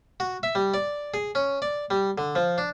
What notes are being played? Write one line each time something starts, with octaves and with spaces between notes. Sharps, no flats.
F#4
E5
G3
D5
G#4
C#4
D5
G3
D3
F3
D4